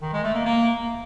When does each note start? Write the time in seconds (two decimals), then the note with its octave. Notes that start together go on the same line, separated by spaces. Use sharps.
0.02 D#3
0.13 G#3
0.24 A3
0.34 A#3
0.45 A#3